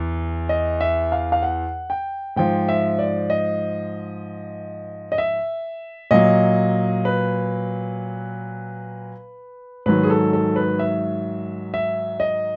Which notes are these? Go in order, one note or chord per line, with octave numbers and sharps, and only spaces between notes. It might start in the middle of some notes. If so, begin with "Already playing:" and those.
Already playing: E2
D#5
E5
F5
F5
F#5
G5
G#2 F3 G5
E5
D5
D#5
D#5
E5
A#2 F#3 D#5
B4
G#2 D#3 F#3 B4
G#4
A4
A4
B4
E5
E5
D#5